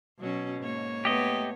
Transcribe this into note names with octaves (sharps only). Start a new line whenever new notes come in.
B2 F#3 C#4
G#2 A#3 C#5
A3 B3 G4 D#5